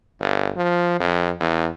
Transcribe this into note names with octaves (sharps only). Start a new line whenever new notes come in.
G1
F3
F2
E2